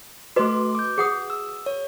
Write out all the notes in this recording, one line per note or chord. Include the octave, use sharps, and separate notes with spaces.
A3 F#4 B4 D#5 C6 D6
D6 G6
G#4 F#5 D#6
E6
C#5